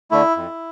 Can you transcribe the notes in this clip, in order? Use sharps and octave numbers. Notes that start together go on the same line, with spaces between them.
D3 A3 E4
F2